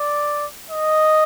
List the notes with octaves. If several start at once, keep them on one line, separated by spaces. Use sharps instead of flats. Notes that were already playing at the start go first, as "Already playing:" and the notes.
Already playing: D5
D#5